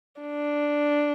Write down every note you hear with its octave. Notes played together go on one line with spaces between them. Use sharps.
D4